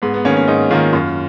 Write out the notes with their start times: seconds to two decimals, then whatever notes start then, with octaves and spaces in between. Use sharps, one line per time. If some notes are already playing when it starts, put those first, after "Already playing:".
0.02 G#2 B3
0.14 B3
0.25 D#3 A#3 C#4
0.37 C#4
0.48 G#2 D#4
0.70 D#3 A#3 F4
0.93 F#2